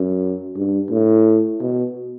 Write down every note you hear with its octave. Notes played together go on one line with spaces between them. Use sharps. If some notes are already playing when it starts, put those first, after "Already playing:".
Already playing: F#2
G2
A2
B2